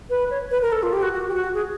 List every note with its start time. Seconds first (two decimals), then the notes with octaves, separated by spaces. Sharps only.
0.10 B4
0.31 C#5
0.51 B4
0.62 A#4
0.72 A4
0.83 F4
0.93 G4
1.02 F#4
1.13 F#4
1.28 G4
1.34 F#4
1.54 G#4